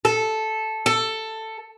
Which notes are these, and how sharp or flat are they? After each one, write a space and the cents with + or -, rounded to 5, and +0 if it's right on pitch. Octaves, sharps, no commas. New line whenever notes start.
A4 -5
A4 +10